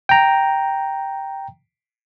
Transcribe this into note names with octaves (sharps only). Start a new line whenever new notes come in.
G5 A#5